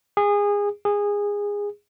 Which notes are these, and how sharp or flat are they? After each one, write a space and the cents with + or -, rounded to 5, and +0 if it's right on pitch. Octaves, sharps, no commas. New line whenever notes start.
G#4 -25
G#4 -20